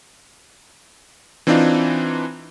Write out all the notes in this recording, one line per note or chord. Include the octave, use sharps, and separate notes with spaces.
E3 C4 D4 D#4 F4